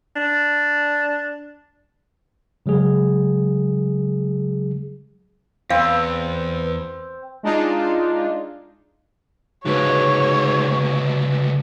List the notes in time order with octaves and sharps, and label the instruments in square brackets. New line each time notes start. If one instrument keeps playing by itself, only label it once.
[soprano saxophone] D4
[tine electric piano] C#3 F#3 G#3 G#4
[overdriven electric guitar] E2 [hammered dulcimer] C4 [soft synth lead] B4 [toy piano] F5
[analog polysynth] G#3 D4 D#4 F4
[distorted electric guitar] C#2 D3 [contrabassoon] G#2 [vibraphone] F#4 B4 [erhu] C#5